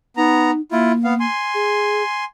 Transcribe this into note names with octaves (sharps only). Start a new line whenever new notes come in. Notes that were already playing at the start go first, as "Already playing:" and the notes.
B3 D#4 A#5
A#3 E4 F4
B3 F5
G#5 C6
G#4